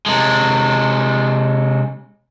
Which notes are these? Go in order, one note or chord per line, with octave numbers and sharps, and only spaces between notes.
C3 G#3